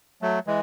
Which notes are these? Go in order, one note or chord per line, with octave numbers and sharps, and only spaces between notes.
F#3 A3
E3 G#3